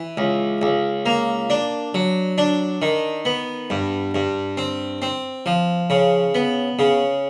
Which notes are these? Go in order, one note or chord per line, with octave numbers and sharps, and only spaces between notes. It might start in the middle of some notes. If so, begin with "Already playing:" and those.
Already playing: E3
C#2
C#2
A#3
D4
F#3
D4
D#3
B3
G2
G2
C4
C4
F3
C#3
B3
C#3